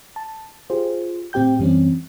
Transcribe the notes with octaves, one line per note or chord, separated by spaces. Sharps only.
A5
F4 G4 G#4 C5
A2 C4 G4 G5 G6
F#2 E3 G3 C4 C#4